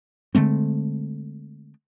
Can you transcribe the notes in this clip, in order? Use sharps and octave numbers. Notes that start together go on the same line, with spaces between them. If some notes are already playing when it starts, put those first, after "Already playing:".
D3 G#3 A3 C4